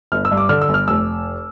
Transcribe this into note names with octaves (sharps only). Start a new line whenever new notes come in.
G1 F6
E6
G2
D6
D3 F6
E6
G1
F6
F1 E6